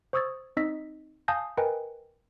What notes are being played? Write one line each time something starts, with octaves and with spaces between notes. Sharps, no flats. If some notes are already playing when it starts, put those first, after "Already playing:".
C5 C#6 D#6 E6 G#6 A6
C4 D#4 D#5 E6 A#6 B6
F5 G#5 A5 D#6 G6 A#6
A#4 B4 D#5 G5 G#5 A#5